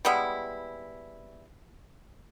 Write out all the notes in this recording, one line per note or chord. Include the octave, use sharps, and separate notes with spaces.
G3 G#3 B3 E4